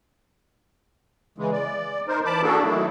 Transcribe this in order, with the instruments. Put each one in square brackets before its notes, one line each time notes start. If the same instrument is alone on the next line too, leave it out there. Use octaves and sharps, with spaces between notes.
[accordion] C#3 E3 G#3
D5
D#4 A#4 C5
E3 A5 B5 D6
A#3 D4 F#4 G#4 A4
D#3 F#3 A3 E4